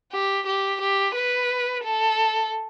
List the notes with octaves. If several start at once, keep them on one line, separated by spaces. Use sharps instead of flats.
G4
G4
G4
B4
A4